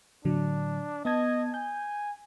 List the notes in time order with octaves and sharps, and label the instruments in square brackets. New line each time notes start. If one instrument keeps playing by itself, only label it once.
[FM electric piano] A2 D3 F#3 [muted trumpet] D4
[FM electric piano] B3 A5 G#6 [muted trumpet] D#5
[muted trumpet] G#5 [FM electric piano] G6